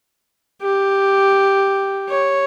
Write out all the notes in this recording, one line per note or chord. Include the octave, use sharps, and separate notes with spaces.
G4
C#5